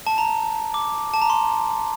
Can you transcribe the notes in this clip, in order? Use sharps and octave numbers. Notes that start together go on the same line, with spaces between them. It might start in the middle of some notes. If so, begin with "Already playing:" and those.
A5
A#5
D6
A5
A#5
C6